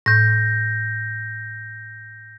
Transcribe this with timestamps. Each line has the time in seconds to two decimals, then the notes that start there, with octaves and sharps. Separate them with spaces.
0.06 A2 G6 A#6